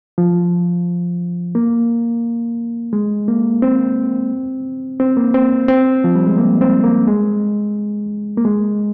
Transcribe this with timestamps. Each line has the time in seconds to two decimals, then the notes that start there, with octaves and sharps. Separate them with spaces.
0.18 F3
1.55 A#3
2.93 G#3
3.28 A#3
3.62 C4
5.00 C4
5.17 A#3
5.34 C4
5.68 C4
6.04 F3
6.15 G3
6.27 G#3
6.38 A#3
6.61 C4
6.84 A#3
7.07 G#3
8.37 A#3
8.45 G#3